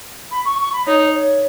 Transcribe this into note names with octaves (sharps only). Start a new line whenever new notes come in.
B5
C#6
C#6
B5
D#4 C#5
C#5